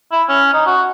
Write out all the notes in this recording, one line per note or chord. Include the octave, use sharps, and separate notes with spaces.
E4
C#4
D#4
F#4